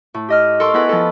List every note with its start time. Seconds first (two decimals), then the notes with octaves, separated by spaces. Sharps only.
0.14 A2
0.28 G4 D#5 F6
0.60 A4 A#4 C6 C#6
0.74 B3 E4 G#4 A#4 B4
0.89 F3 A4